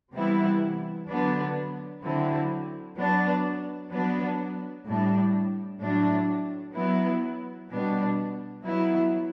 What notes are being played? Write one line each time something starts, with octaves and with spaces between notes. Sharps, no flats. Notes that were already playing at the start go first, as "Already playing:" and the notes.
C3 E3 G3 B3 E4
D3 F#3 B3 D4
D3 F#3 C4 E4
F#3 B3 D4
F#3 B3 D4
A2 G3 D4
A2 F#3 A3 D4
F#3 B3 E4
B2 G3 B3 D4
F#3 B3 E4